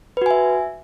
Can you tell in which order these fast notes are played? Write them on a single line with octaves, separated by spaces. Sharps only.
B4 F#4 G#5 E5